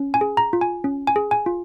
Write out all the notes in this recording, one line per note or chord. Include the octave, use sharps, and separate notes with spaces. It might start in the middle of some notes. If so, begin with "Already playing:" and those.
Already playing: C#4
G#5
G#4
A#5
F4
G#5
C#4
G#5
G#4
G#5
F4